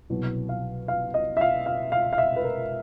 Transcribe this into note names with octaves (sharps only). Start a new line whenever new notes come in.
C2 B2 F#3
F5
F5
D#5
E5
F5
F5
F5
F5
E5
B4
A#4